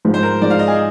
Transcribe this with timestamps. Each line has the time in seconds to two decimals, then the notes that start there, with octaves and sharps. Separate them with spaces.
0.05 G#2 F3 G#3
0.14 C5
0.23 A#4
0.41 G#2 F3 G#3 D5
0.50 F5
0.59 D#5
0.68 G#4